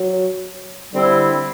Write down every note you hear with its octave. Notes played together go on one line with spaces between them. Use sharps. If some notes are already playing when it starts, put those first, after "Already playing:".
Already playing: F#3
D3 G3 C4 E4